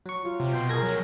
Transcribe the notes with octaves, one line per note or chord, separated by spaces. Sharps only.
F#3 C#6
F#3 F4
C3
B2 G5 C6
G#4 A#4 G#6 A#6
F#3